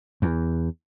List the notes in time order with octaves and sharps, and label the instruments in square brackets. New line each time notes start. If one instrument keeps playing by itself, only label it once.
[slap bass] E2